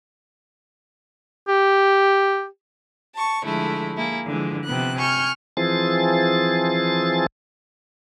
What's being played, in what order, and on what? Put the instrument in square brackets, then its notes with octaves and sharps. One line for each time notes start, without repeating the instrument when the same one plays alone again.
[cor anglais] G4
[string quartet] A5 C#6
D3 F3 G#3 A3 E4
A#3 E4 G#4
D3 E3 F3 G#3
C3 F3 B3 F#6
G#5 C#6 F6 G6
[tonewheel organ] E3 F3 C4 G#4 A6